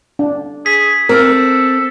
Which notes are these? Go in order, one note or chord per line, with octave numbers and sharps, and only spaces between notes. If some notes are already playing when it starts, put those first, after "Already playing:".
D4
G#4 B6
C4 A4 A#4